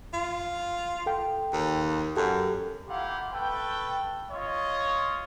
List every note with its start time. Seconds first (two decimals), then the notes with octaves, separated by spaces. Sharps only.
0.13 F2 F4
1.06 A4 G5
1.53 D#2
2.17 F#2 G4 A4
2.88 A#3 E4 F4 G4 F5 F#5
3.33 A3 A4 B4 G5
4.32 F4 C#5 D#5